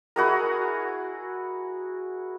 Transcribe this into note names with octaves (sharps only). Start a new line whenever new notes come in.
E4 F#4 G#4 A#4